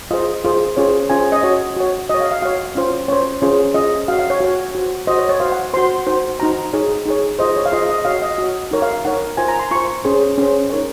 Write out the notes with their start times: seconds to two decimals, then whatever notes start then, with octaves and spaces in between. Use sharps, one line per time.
0.11 F4 G#4 C5 D#5
0.44 F4 G#4 C5
0.77 C#4 F4 G#4 C5 C#5
1.10 C#4 F4 G#4 C5 G#5
1.32 D#5
1.43 F#4 C#5
1.76 F#4 C#5
2.10 F#4 C#5 D#5
2.21 F5
2.31 F5
2.42 F#4 C#5 F5
2.75 C#4 F4 C5
3.08 C#4 F4 C5 C#5
3.42 C#4 F4 G#4 C5
3.74 C#4 F4 G#4 C5 D#5
4.08 F#4 C#5 F5
4.19 F5
4.30 C#5
4.41 F#4 C#5
4.75 F#4 C5
5.07 F#4 C5 D#5
5.19 C#5
5.29 C#5
5.40 F#4 C5 F5
5.52 F#5
5.74 F#4 C5 C6
6.07 D#4 F#4 C5
6.39 D#4 F#4 C5 A#5
6.73 D#4 G#4 C#5
7.06 D#4 G#4 C#5
7.39 F4 G#4 C5 D#5
7.56 C#5
7.66 F5
7.72 F4 G#4 C5 D#5
7.89 D#5
8.05 F#4 C#5 F5
8.22 D#5
8.38 F#4 C#5
8.71 D#4 A#4 C#5
8.82 F5
8.94 F5
9.05 D#4 A#4 C#5 F#5
9.37 F4 C5 G#5
9.48 A#5
9.59 C6
9.71 F4 C5 C#6
10.04 C#4 G#4 C5
10.38 C#4 G#4 C5
10.70 D#4 A#4 C#5